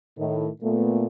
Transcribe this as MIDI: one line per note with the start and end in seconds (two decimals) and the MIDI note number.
0.18 0.47 45
0.18 0.47 51
0.18 0.47 63
0.62 1.07 46
0.62 1.07 57
0.62 1.07 59